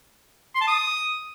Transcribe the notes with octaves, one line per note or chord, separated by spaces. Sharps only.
C6
A5
D#6